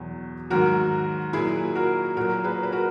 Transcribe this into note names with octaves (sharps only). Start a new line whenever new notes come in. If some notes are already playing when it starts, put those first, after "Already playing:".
Already playing: E2 B2 F#3
G#2 D#3 F#3 F#4 A#4
A#2 F#3 E4 G#4
F#4 A#4
A#2 F#3 F#4 A#4
G#4 B4
B4
F#4 A#4